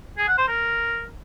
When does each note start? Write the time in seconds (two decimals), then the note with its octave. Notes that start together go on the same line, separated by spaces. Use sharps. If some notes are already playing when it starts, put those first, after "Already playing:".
0.18 G#4
0.28 F#5
0.38 C5
0.48 A#4